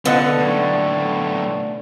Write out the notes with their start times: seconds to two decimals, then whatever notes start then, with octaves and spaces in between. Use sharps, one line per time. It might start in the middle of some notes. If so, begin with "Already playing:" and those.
0.05 D3 B3 D4 A4 D#5 F#5
0.38 B1 A2